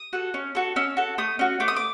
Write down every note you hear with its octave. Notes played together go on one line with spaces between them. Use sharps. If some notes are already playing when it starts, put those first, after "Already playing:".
Already playing: D#6
F#4 A4
C#4
F#4 A4
C#4 E6
F#4 A4
A3 D#6
C#4 F#4
A3 D6
D#6
D6